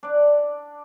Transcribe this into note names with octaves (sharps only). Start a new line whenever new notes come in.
D4 D5